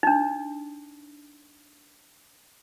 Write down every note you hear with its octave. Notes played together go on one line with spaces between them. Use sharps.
D4 D#4